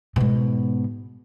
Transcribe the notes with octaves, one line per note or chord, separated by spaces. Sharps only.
G#2 B2